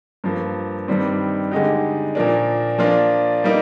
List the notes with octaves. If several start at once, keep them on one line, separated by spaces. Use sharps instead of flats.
G2 F3 A#3
G2 D#3 G3 C4
D3 G#3 D#4 G4
A#2 F3 A#3 D4
F3 A#3 D4 F4
G3 A#3 D#4